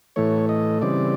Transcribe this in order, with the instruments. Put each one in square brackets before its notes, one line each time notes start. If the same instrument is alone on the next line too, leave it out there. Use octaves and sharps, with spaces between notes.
[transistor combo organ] A2 E3 A3 C#5
D#5
C#3 E3 G3 C4 D5